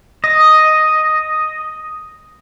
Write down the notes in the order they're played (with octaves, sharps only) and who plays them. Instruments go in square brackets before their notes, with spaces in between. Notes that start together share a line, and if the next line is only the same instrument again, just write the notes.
[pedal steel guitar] D#5 [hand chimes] D#6